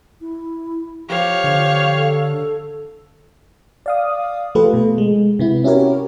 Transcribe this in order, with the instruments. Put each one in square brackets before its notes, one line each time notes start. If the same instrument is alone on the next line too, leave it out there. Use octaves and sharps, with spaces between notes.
[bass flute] E4
[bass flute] F3 [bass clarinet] G4 [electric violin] C#5 F5
[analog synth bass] D3
[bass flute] A4
[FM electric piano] D5 F5 D#6
F3 A3 F4 G4 A4 B4
B2
G#3
C3 B3 E4
C#4 E4 F#4 G4 A#4 C#5